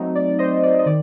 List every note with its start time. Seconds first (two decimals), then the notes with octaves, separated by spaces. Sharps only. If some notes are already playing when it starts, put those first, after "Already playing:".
Already playing: F#3 A3 C4 D#4
0.15 D5
0.39 C5 D#5
0.64 D5
0.79 D#5
0.86 D#3 D5